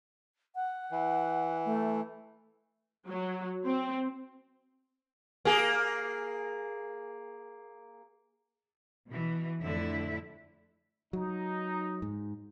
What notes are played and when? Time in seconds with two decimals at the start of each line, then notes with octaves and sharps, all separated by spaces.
0.55 F#5
0.91 E3
1.66 A3
3.09 F#3
3.66 C4
5.45 A#3 G#4
9.09 B2 E3
9.60 F2 A2 D3 E4 E5
11.13 F#3 D#4
12.02 G#2